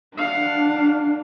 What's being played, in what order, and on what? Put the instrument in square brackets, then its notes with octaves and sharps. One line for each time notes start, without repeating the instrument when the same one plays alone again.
[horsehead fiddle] D4 [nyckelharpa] F5 F#5